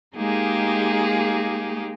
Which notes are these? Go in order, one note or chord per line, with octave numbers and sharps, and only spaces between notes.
G#3 A#3 D#4 G4 G#4